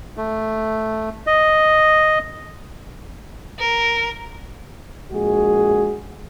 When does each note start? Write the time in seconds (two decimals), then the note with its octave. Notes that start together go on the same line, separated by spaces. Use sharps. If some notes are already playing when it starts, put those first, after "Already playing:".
0.17 A3
1.27 D#5
3.59 A#4
5.12 A#1 G#3 F#4 G#4